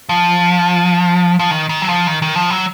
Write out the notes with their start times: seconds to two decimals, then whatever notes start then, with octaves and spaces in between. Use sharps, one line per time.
0.09 F3
1.39 F3
1.51 D#3
1.69 D#3
1.82 F#3
1.89 F3
2.07 D#3
2.22 D#3
2.35 F3
2.50 F#3